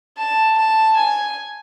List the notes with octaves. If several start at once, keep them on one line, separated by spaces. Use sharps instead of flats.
A5
A5
G#5